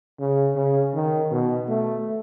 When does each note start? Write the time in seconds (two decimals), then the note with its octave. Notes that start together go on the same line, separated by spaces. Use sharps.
0.19 C#3
0.56 C#3
0.95 D#3
1.31 B2
1.69 A3